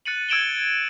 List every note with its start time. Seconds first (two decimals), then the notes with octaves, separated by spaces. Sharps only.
0.05 F#6 A6 C#7 D#7 F#7
0.29 E6 G#6 D7 E7 F#7 G7